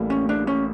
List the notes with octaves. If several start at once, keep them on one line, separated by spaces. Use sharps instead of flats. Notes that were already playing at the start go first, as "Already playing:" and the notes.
Already playing: A1 A2 G3 A#3
C#4
D4
C#4